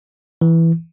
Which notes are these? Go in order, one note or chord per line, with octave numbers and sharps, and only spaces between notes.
E3